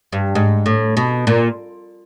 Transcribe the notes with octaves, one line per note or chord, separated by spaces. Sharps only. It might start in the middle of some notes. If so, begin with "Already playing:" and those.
G2
G#2
A2
B2
A#2